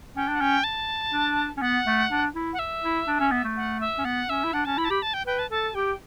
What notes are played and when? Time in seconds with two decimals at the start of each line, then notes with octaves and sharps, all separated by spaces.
0.16 C#4 G5
0.28 D4
0.35 F#5
0.40 C#4 G5
0.64 A5
1.13 D4
1.57 C#4
1.61 B3 F#5
1.86 A3
2.10 D4
2.35 E4
2.53 F#5
2.59 E5
2.83 E4
3.07 D4
3.20 C#4
3.32 B3
3.44 A3
3.56 F#5
3.80 E5
3.98 C#4
4.05 B3 F#5
4.29 C#4 E5
4.44 E4
4.53 D4 F#5
4.65 C#4 A5
4.78 E4 B5
4.85 A5
4.90 G4 B5
5.02 A5
5.14 G5
5.26 B4 G5
5.39 A5
5.51 A4 A5
5.75 G4 G5